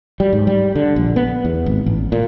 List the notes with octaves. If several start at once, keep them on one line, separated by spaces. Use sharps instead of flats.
G3
G#2
G3
D3
A#1
B3
E2
G#1
A1
A#2